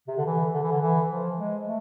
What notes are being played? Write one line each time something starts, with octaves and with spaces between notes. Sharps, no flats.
C3
D3
E3
D3
E3
D3
E3
F3
G#3
A3